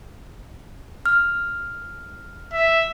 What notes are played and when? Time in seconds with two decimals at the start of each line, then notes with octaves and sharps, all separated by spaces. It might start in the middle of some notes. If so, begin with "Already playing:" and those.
1.06 F6
2.53 E5